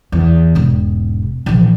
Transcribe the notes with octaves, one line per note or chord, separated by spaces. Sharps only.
E2
E1 G#2
A#1 E3